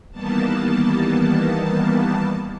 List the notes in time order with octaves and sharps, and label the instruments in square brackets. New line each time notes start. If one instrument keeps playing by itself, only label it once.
[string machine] D#3 E3 G3 A#3 B3 A5